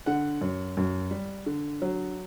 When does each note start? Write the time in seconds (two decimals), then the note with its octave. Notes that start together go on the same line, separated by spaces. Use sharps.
0.06 D3 F#5
0.41 F#2
0.77 F#2
1.11 G3
1.46 D3
1.82 F#3